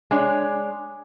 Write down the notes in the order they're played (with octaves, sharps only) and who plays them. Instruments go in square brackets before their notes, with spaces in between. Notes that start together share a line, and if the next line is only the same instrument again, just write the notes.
[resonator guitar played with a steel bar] G#3 D4 C#5